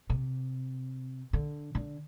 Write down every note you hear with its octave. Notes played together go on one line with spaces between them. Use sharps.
C3
D3
D3